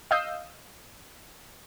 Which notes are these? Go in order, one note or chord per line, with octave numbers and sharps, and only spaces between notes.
D#5 F5 D#6 E6 G6 C7